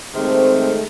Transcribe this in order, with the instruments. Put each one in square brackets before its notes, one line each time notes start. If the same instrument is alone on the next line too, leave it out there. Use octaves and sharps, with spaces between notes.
[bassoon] C3 [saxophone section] D#3 G#3 G#4 [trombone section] A3 [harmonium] C4